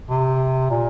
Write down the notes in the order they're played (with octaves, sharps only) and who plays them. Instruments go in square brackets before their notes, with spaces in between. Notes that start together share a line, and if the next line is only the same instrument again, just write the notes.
[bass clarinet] C3
A#2